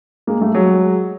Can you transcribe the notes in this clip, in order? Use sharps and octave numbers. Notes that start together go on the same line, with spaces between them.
G#3 A#3
G3 A3
F#3 G#3